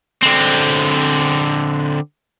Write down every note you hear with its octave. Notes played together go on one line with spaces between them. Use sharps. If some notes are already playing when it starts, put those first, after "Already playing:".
D3 C4